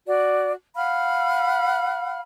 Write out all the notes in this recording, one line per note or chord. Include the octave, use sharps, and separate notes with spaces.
F#4 D5
F5 F#5 B5 F6